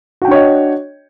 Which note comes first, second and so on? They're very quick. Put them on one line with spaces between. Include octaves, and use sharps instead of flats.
F#4 G5 D4 C#5 D#5